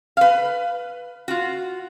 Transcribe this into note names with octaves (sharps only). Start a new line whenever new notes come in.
B4 F5
F4 F#4